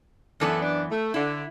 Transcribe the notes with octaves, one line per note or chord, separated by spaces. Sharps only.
F#2 E3 B3 A4 D5
D4
A3
D3 E4